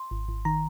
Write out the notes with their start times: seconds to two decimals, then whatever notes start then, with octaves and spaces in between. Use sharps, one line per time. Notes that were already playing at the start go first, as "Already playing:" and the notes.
Already playing: C6
0.11 G#1
0.28 G#1
0.45 D#3 A#5